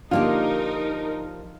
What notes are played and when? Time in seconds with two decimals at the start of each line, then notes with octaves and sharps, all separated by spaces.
0.11 D3 F3 A#3 D#4 F4 G4 A#4